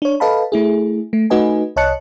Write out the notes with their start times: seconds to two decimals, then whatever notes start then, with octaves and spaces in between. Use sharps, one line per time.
0.02 D4 C#5
0.20 A4 B4 D#5 F5 A5 B5
0.52 A3 E4 G#4
1.13 A3
1.30 A3 D#4 F#4 B4 D#5 G#5
1.76 C2 C#5 D#5 A5 F#6 C#7